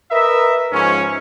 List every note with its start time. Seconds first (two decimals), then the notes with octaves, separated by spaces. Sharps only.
0.11 A#4 B4 D#5 E5
0.72 G#2 F3 C#4